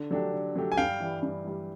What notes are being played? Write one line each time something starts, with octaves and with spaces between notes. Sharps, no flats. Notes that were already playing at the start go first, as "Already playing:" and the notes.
Already playing: D3
F#3 A3 D4 G4
D3
F#3 A3 D4 G4
G#5
G2 F5 G5
E3 G3
G2
E3 G3